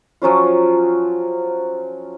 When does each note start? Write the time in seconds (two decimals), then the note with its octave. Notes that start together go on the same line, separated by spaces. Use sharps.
0.22 F3 F#3 C#4 F4